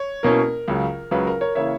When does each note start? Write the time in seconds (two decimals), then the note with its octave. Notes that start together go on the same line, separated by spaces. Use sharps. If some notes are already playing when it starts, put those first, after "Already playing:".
Already playing: C#5
0.23 B2 A#3 C#4 E4 A#4
0.68 C#2 C#3 F#3
1.11 C#2 C#3 F#3 B4
1.27 A#4
1.41 A#4 C#5
1.55 C#3 E3 A#3 E4 C#5 E5